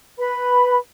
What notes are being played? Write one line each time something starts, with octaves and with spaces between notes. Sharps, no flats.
B4 B5